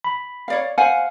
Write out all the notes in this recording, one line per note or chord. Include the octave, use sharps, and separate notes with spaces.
B5
C#5 D5 F5
C5 F5 F#5 G#5